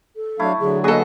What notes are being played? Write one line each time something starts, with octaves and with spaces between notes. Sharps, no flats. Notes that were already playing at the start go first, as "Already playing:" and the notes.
A4
F#3 A3 D4 E4 F5
D3 F#3 G#4
B2 A#3 F#4 G#4 A4 D#5